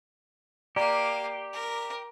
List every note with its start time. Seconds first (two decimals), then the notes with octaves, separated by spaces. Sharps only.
0.76 A#3 G4 D5 F5 A#5
1.53 A#4